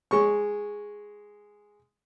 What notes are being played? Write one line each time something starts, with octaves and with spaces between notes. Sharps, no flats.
G#3 C#6